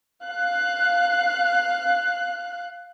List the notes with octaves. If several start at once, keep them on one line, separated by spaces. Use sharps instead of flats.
F5 F#6